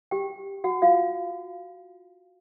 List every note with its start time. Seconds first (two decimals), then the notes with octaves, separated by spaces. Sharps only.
0.11 G4 G5
0.64 F#4 F#5
0.82 F4 F5